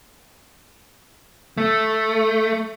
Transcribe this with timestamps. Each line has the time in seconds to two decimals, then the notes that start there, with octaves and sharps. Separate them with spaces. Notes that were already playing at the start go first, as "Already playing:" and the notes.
1.58 A3